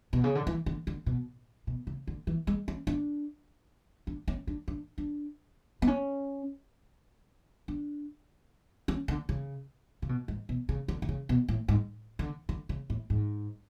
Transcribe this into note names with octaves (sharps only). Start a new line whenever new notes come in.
B2
C#3
D3
E3
D3
D3
B2
B2
C#3
D3
E3
G#3
C#4
D4
D4
C#4
D4
D4
D4
B3
C#4
D4
C#4
D3
C#3
C#3
B2
G#2
B2
C#3
D3
D3
C#3
B2
A2
G#2
D3
D3
C#3
A2
G#2